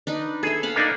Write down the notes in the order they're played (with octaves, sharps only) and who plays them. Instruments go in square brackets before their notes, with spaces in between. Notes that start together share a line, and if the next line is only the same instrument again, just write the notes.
[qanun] D4 D#4 B4
[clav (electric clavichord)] G#4 [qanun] A4 E5
[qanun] F5 F#5 B5
[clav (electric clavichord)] A#3 D4 D#4